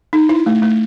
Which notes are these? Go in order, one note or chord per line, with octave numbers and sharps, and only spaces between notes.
D#4
E4
A3
A3